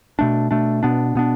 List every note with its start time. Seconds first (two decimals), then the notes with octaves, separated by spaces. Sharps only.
0.19 B2 A3 D4
0.51 B2 A3 D4
0.83 B2 B3 D4
1.15 B2 B3 D4